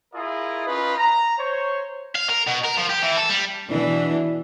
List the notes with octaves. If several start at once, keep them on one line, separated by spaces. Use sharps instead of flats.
E4 F4 G#4 A#4 D#5
C#4 D#4 F4 B4
A#5
C5 C#5
F5
A#4
B2
A#4
F3
G4
E3
A4
G3
B2 E3 D4